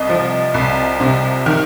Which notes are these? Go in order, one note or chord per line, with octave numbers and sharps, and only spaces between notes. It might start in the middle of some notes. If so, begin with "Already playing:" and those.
Already playing: C2 D#5
F3
C2
C3
D#3